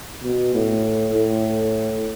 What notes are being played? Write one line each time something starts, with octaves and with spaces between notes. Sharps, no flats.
B2
A2
A2